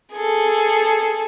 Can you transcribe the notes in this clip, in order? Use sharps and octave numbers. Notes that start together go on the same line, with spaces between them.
G#4 A4